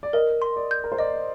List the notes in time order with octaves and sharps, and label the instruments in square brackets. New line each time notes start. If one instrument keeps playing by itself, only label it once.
[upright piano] D5
[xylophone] A#4 [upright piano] D#5
[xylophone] C6
[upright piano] D5
[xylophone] G6
[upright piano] A#4
C5
[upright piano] D5 [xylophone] D#5